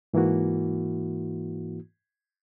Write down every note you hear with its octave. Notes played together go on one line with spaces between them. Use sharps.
G#2 E3 A#3 E4 F#4